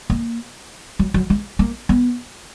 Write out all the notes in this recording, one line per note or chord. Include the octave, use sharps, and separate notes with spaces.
A#3
F#3
F#3
G#3
A#3
B3